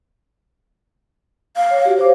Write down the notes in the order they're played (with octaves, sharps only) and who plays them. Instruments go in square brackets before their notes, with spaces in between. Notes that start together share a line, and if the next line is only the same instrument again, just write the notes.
[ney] F5
[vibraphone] C#5
F#4 G4
[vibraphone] C5 C#5 D6 [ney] F5